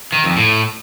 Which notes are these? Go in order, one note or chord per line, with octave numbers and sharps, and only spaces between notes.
D#3
F2
A2